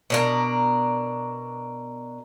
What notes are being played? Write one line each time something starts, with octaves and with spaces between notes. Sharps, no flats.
B2 D4 A#4